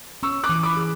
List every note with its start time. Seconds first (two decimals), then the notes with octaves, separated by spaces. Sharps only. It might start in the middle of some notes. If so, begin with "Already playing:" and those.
0.23 C#4 C#6 E6
0.44 D6 F#6
0.49 E3
0.63 B5 D6
0.77 G#4